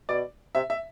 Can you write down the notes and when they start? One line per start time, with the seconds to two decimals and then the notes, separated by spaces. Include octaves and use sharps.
0.09 B2 D5
0.55 C3 E5
0.70 E5